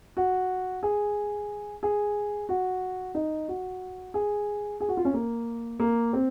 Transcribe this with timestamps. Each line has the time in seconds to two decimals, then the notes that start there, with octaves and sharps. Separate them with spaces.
0.17 F#4
0.83 G#4
1.83 G#4
2.49 F#4
3.15 D#4
3.48 F#4
4.14 G#4
4.80 G#4
4.88 F#4
4.97 F4
5.05 C#4
5.14 A#3
5.80 A#3
6.13 C4